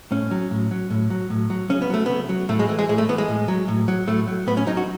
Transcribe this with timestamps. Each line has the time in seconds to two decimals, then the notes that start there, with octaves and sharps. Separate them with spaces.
0.11 A2 C#4
0.31 F#3
0.51 A2
0.71 F#3
0.90 A2
1.10 F#3
1.30 A2
1.50 F#3
1.70 C#3 C#4
1.82 B3
1.90 F#3 A3
2.06 C#3 B3
2.29 F#3
2.49 A2 A3
2.59 G#3
2.69 E3 A3
2.79 G#3
2.89 A2 G#3
2.98 A3
3.09 E3 B3
3.18 G#3
3.28 A2
3.48 F#3
3.68 A2
3.88 F#3
4.07 A2 A3
4.27 F#3
4.47 A2 B3
4.57 C#4
4.67 F#3 D#4
4.77 F#4